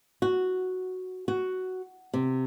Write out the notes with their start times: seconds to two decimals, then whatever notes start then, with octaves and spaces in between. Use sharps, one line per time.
0.22 F#4
1.28 F#4
2.14 C3